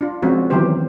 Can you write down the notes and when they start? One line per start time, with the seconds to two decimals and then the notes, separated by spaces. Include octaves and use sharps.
0.01 D4 F4
0.22 F3 G#3 C4 C#4 F#4
0.50 D#3 E3 F#3 B3 G4 C5